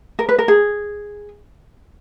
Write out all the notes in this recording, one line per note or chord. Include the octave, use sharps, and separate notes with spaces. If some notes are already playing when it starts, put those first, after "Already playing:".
A#4
B4
A#4
G#4